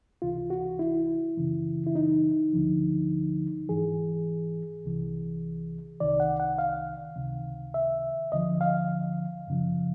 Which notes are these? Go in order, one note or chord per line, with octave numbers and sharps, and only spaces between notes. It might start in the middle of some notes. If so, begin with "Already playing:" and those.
C#2 C3 E3 F4
F#4
E4
F#2 C#3 E3
E4
D#4
D2 D3 F3
G#2 E3 G#4
C2 C3 E3
C2 C3 D#3 D5
F#5
F#5
F5
C#2 C3 D#3
E5
D2 D3 F3 D#5
F5
F#2 C#3 F3